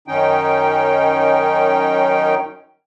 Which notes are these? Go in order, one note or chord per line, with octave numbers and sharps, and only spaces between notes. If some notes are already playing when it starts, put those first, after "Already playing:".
F#2 D#3 C#4 D#4 G5